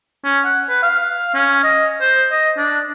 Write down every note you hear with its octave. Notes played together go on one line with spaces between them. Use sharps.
C#4
F#5
B4
F5
C#4
D#5
C5
D#5
D4